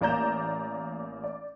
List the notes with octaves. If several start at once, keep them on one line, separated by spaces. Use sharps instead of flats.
A1 A#3 D5 A#5 G6 E7
D5